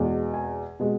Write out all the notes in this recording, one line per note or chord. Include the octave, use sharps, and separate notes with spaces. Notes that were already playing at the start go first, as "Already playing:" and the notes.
Already playing: E2 B2 G#3
G#5
B2 G#3